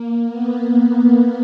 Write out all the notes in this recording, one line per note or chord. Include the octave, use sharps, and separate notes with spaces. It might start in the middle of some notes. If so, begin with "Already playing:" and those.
Already playing: A#3
B3
A#3